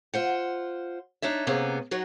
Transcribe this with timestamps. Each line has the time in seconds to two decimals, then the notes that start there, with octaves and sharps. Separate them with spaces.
0.14 F4 C5 F#5
1.22 D4 D#4 C#5 E5
1.47 C3 A#3 B3 C#4 G#4
1.91 F#3 D#4 F#4 C#5